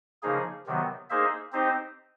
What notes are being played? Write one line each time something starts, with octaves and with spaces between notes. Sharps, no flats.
C#3 F3 A#3 D#4 G#4
C3 D#3 F#3 B3
A#3 D#4 G#4 C5 E5
C4 D#4 G4 C5